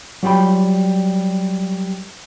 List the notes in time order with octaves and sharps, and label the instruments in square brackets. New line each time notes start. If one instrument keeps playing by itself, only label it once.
[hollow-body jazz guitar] F#3 G3 F4 G5 B5